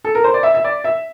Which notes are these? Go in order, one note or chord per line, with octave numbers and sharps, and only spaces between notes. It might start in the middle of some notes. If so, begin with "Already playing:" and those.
A4
A#4
C5
D5
E5
E5
D5
E5